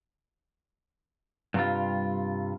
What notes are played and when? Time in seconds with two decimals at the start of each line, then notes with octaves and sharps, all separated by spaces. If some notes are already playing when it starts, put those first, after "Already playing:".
1.54 G2 C3 D#3 G3 F4